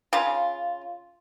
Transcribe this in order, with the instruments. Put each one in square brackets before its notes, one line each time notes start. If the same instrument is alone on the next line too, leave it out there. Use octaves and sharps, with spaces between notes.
[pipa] C#3 F4